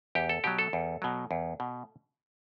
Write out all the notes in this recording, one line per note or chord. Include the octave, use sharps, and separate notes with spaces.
E2 G4
A4
B2 F#3 G4
A4
E2
B2 F#3
E2
B2